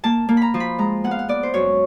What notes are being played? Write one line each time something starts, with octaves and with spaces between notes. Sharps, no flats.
A#3 A5
A#3
A#5 B5
F3
B5
G#3 A#5
B3 F#5
F5
F#5
B3 D5
C5
F#2 C#5